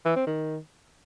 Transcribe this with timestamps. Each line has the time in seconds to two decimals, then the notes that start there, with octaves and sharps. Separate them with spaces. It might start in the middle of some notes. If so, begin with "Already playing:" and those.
0.05 E3
0.16 C4
0.27 D#3